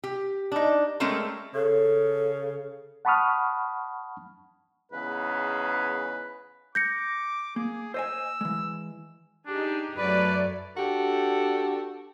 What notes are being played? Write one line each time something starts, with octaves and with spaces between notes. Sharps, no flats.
G4
D4 D#4
G#3 A3 C4 C#4 A4 A#4
C#3 A4
F#5 A5 B5 C#6 D#6 F6
E2 G#2 C#3 B4
D6 G6 A#6 C#7
A#3 G#4
C5 D#5 G#5 E6
E3 G#3
D4 D#4 G4 G#4
F#2 F#3 A3 B4 D5
D4 F#4 G4 A4